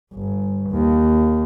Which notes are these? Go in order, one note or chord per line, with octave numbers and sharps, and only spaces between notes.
G1
D#2